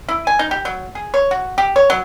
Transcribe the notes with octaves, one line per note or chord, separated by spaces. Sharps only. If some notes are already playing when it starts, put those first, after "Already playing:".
E4
G#5
D#4
G4
F#3
G#4
C#5
F#4
G4
C#5
F#3